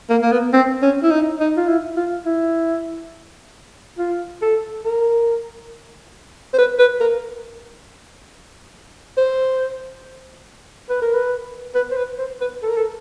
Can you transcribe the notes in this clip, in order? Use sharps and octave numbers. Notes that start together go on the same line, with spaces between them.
A#3
A#3
B3
C4
C#4
E4
D#4
D#4
F4
E4
F4
E4
F4
A4
A#4
C5
B4
B4
A#4
C5
B4
A#4
B4
B4
C5
B4
C5
B4
A4
A#4
A4